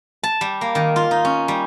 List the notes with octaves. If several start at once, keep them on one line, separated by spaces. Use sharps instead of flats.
A5
G3
A#3
D#3
F4
D#4
C#4
G3